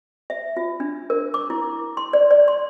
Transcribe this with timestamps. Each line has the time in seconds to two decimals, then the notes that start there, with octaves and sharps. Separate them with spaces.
0.30 E5
0.57 F4
0.80 D4
1.10 A#4
1.34 D6
1.50 E4
1.97 C6
2.13 D5
2.31 D5
2.48 C6